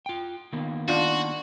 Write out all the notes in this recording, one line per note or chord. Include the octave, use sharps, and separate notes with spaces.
F4 G5
D#3 A#3 B3
D4 F4 F#4